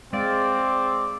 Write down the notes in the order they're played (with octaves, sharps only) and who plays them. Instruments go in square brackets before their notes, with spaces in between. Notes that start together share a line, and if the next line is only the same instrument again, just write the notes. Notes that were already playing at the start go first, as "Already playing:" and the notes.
[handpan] G#3 F5 [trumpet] C4 [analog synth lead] D5